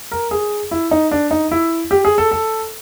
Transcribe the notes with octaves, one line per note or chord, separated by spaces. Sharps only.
A#4
G#4
E4
D#4
D4
D#4
E4
G4
G#4
A4
A4